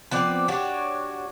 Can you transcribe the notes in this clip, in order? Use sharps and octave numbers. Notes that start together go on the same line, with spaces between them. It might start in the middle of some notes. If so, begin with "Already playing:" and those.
F3 B3 C4 D5
D4 F#4 G4 C#5